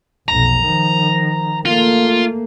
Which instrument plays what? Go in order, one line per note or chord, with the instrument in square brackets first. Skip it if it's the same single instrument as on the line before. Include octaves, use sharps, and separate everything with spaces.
[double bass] F1 B1 [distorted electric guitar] A#5
[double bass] D#3 F3
[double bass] A3 A#3 [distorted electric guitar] F4